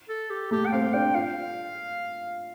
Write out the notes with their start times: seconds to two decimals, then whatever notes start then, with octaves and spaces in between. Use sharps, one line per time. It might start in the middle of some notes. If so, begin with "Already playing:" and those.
0.09 A4
0.30 G4
0.51 A3 G4
0.66 G5
0.72 C4 F5
0.93 D4 G5
1.15 F4 F5